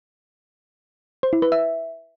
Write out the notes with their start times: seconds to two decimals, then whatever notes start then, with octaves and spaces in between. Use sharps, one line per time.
1.23 C5
1.33 E4
1.42 B4
1.52 E5